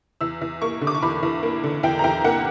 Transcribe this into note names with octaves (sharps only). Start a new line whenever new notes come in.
E2 E6
E2
A#3 C#6
D3
D6
C#6
E2 B5
E2
A#3
D3
E2 G5
A#5
E2 G5
A#3 F#5